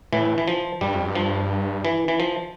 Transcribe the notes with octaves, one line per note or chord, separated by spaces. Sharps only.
A2 E3
E3
F3
G2 G3
F2
G2
F3
E3
E3
F3